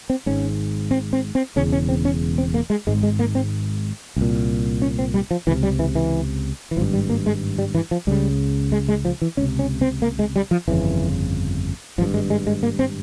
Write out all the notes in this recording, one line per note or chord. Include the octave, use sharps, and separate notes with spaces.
C4
G#1 G#2 C#4
C4
C4
C4
E1 E2 C#3 C#4
C#4
C4
C#4
C4
A#3
G#3
G#1 G#2 G#3
G#3
A#3
C4
C2 A#2
C#4
C4
G3
F3
C#2 C3 E3
G3
E3
E3
E3
G#1 G2 F3
G3
A#3
G#3
G3
E3
F3
C#2 C#3 G3
G#3
G#3
F3
E3
C#2 C3 C#4
C#4
C4
A#3
G#3
G3
F3
G1 F2 C#3 E3
G#1 G2 F3
G#3
G#3
G#3
A#3
C4